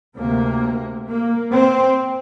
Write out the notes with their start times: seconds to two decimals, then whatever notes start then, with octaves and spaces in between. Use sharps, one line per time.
0.17 D2 C3 A#3
1.08 A#3
1.54 C4